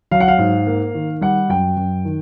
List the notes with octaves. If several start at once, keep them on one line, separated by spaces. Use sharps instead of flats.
F#3 F5
F#5
F5
G#2
A#3
D#3
G3 F#5
F#2 G5
F#2
D#3